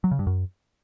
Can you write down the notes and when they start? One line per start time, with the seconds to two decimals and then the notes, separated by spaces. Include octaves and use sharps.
0.04 F#3
0.11 C#3
0.19 G2
0.27 F#2